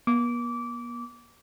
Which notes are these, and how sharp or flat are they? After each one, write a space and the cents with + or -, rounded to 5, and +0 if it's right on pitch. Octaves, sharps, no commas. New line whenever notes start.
B3 -45 D6 -20